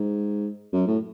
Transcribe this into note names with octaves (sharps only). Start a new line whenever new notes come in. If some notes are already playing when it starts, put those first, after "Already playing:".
Already playing: G#2
F#2
A2